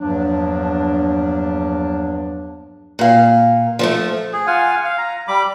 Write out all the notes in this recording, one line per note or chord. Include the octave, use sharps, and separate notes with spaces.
E2 G2 F3 F#3 A#3 D4
A#2 F5
F3 G#3 A3
G#4
F4 F5 F#5 G#5
F5
A#5
G3 B5 D6